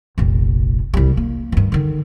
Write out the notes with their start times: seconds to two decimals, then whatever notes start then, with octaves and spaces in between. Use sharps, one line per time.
0.18 F1 A#1
0.94 C2 G3
1.17 A#3
1.52 G2 D#3
1.72 D3 D#3